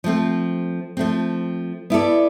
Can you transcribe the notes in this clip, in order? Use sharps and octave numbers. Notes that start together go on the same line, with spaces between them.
F3 A3 C4
F3 A3 C4
B3 E4 A4 D5